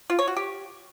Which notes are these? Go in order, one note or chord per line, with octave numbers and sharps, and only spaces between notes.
F4
C#5
F#4
G4